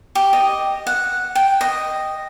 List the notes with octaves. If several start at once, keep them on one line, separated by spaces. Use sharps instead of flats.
G4
D#5
F#5
G5
D#5